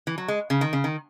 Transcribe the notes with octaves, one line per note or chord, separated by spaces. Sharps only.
E3
F#3
G#3
C#3
D#3
C#3
D#3